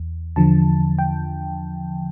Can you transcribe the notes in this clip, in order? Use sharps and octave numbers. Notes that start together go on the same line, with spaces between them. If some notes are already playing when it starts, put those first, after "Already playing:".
Already playing: E2
E2 D3 F3 A5
G5